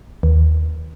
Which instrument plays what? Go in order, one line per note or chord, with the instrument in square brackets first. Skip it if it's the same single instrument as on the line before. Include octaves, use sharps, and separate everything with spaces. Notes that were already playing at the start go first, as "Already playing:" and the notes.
[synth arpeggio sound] D#2